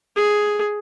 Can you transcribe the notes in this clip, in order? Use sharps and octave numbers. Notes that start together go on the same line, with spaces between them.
G#4